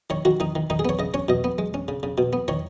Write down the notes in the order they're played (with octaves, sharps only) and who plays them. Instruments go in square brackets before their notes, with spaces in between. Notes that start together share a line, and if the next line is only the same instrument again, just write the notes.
[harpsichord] D#3 C#5
D#3 F#4
D#3 D#4
D#3
D#3 D#4
G#4
B3 C#5
C#3 D#5
C#4 C#5
B2 D#5
B3
G#3
C#4
C#3
C#3
B2
B3
D#3 C#5